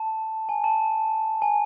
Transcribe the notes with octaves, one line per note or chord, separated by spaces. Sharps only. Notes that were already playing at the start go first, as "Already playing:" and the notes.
Already playing: A5
G#5
A5
G#5